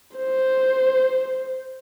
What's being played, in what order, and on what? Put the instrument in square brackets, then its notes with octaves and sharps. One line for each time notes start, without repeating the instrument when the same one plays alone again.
[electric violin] C5